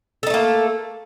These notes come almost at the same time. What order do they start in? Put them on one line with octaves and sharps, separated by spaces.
A4 D#4 A3 A#3